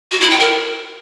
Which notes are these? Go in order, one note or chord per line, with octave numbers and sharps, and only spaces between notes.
F#4
E4
G5
A#4